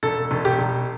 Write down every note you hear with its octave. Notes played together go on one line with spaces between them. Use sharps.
E1 A4
E1
G4
E1